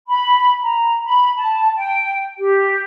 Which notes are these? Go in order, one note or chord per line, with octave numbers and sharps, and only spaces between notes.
B5
A#5
B5
A5
G5
G4